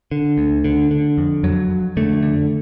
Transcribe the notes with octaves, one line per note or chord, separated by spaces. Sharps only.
D3
D2
D3
D3
F2
F2 F#3
F2
D3 A3
D3